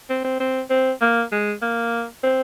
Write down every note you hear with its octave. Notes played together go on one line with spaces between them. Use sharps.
C4
C4
C4
C4
A#3
G#3
A#3
C4